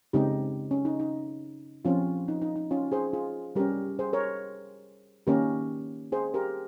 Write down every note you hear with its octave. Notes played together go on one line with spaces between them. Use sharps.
C#3 G#3 C4 D#4 G4
C#4
D#4
D#4
F3 C4 C#4 F4
D#4
D#4
D#4
C#4 F4
G#4 C5
F4 G#4
G3 C#4 G4 A#4
G#4 C5
A#4 C#5
D#3 A#3 C#4 G4 A#4
G#4 C5
G4 A#4